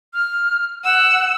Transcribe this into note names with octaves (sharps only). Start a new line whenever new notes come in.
F6
F#5 E6